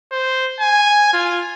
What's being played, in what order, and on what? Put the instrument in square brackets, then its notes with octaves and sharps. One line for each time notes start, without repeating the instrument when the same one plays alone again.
[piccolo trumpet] C5
G#5
F4